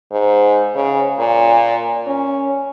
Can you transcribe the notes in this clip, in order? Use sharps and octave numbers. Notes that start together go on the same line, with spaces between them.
G#2
C#3
A#2
C#4